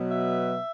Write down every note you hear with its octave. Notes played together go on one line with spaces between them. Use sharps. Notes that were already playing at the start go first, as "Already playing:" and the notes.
Already playing: B2 F#3 B3
E5